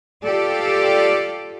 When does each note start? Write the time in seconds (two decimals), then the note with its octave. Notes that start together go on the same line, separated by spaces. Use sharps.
0.24 F4 G4 A4 D5